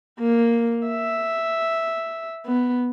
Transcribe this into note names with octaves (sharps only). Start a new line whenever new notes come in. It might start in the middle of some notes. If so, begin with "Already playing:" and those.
A#3
E5
B3